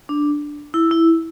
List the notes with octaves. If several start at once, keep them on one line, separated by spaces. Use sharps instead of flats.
D4
E4
E4